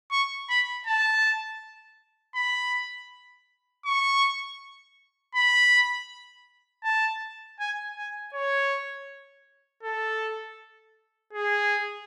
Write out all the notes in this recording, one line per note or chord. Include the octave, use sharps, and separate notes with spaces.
C#6
B5
A5
B5
C#6
B5
A5
G#5
G#5
C#5
A4
G#4